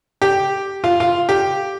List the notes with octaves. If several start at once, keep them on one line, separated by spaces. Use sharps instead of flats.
G4
F4
F4
G4